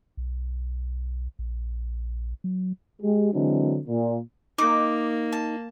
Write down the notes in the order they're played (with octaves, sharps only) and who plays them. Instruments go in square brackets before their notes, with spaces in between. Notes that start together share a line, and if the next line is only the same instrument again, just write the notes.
[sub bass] B1
A#1
F#3
[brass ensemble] G#3 G4
D3 E3 F#3 G#3 C4 D4
A#2
[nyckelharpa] A#3 [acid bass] D#4 [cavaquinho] D6
[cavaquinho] A5